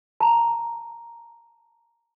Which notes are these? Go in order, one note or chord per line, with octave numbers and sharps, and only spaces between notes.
A5 A#5